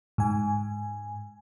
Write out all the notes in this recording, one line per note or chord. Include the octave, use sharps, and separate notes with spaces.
G#2 G#5